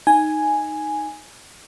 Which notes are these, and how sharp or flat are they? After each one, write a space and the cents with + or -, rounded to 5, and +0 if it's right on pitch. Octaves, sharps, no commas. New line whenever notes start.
D#4 +0 G#5 +0